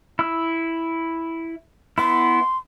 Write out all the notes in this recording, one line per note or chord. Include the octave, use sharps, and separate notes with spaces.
E4 E6
B3 E4 C6